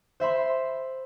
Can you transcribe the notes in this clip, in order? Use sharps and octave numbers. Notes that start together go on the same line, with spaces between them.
C5 E5 B5 C6